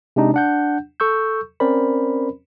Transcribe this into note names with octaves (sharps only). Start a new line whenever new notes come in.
C3 G#3 D4 D#4 G4
D4 F#5 G6
A4 C#6 E6 G6
C4 C#4 A#4 C5 D5 B5